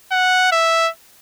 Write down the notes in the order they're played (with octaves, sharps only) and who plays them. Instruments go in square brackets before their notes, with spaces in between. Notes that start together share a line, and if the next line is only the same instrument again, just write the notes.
[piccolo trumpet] F#5
E5